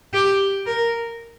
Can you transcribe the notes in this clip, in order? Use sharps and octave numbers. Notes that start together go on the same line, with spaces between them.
G4
A#4